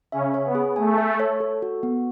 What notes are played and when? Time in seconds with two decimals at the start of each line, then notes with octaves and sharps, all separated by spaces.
0.12 C#3 C#4 E5
0.34 C#5
0.45 B3
0.55 G#4
0.76 A3 G#5
0.98 E5
1.20 C#5
1.40 A4
1.62 F#4
1.83 B3